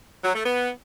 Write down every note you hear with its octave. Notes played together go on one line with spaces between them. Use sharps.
F#3
A3
B3